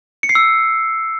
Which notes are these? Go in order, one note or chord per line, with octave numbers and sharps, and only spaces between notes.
C#7
C7
E6